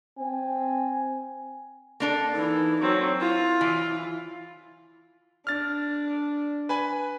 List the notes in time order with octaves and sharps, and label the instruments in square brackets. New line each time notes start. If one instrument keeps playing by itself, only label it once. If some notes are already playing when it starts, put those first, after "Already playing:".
[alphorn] C4 [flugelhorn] G#5
[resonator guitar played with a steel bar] A#3 D4 A4
[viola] E3 [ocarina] D#4
[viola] F#3 C4
[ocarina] E4 [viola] F4
[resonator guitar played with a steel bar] E3
[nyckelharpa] D4 [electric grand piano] F6 A6
[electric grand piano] B4 G#5 B5